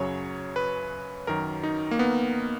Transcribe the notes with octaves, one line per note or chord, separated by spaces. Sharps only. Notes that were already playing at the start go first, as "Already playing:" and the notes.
Already playing: F#2 C#3 F#3 C#5
B4
F#2 D#3 F#3 A#4
D#4
A#3
B3